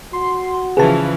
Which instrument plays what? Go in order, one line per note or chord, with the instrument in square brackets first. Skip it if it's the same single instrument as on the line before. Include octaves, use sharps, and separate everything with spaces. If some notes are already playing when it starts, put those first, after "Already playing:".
[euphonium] F#4 [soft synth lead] C6
[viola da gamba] C#3 E3 F3 [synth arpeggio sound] G#4 A5 [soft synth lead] B4